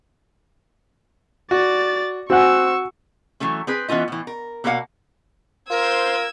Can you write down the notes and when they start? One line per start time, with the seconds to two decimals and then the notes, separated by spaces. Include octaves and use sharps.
1.51 F#4 D5 A6
2.30 C4 F#4 F#5 G#5 C#6 E6 F#6
3.40 E3 F#3 A3 C#4
3.67 C4 G#4 B4
3.88 E3 B3 C#4 F4 D#5
4.08 A2 E3
4.27 A#4
4.64 B2 A#3 A4 C5 F5 F#5
5.70 F4 A#4 C5 E6 G#6